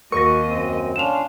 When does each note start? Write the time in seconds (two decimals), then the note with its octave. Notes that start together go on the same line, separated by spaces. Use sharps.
0.12 D#2 F#4 A#4 D#5 C#6 A#6
0.45 F#2 C4
0.96 C#4 D4 F4 E7 F7